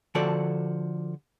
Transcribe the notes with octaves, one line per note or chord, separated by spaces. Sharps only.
D3 F3 F#4 A4 D5